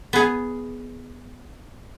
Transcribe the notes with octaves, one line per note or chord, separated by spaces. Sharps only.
B3 G#4